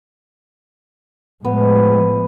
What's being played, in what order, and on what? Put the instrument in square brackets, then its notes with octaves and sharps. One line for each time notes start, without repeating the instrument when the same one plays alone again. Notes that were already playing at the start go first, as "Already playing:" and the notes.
[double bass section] A2 F3 G#3 [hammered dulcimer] B3